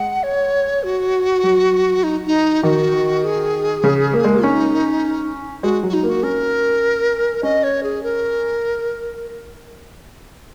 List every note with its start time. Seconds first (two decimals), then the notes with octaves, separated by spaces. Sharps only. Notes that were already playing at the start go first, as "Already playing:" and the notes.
Already playing: G#3 F#5
0.23 C#5
0.83 F#4
1.43 F#3
2.03 D#4
2.27 D#4
2.63 D#3 F#4
3.24 G#4
3.84 C#3
4.14 A#3
4.25 G#3
4.34 A#3
4.43 C#4 D#4
5.63 G#3 F#4
5.83 F#3
5.89 F#4
5.93 D#4
6.03 A#3
6.09 F#4
6.23 C#4 A#4
7.43 C#4 D#5
7.63 C#5
7.83 G#4
8.03 A#4